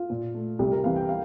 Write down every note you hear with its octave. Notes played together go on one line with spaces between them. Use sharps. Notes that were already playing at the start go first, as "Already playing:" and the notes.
Already playing: F4
A#2
A3
C2 G4
A#4
C3 E3 A#3 F5
G5
F5